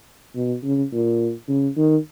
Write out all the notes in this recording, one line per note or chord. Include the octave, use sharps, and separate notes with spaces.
B2
C#3
A#2
C#3
D#3